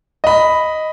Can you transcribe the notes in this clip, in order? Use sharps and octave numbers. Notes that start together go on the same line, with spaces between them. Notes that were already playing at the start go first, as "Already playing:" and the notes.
D#5 B5